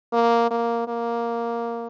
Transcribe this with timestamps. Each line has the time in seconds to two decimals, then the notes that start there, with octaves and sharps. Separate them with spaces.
0.12 A#3
0.50 A#3
0.87 A#3